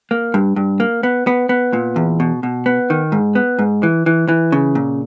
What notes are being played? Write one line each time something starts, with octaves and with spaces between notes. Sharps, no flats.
A#3
G2
G2
A#3
B3
B3
B3
A#2
E2
B2
B2
B3
D#3
G#2
B3
G#2
E3
E3
E3
C#3
A#2